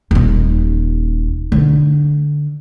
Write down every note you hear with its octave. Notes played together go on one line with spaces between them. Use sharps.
D#1 D#4
D3